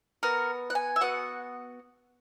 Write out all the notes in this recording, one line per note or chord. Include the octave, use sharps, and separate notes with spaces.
B3 F#4 A#4
F#5
G#5
E5
B3 F#4 F#5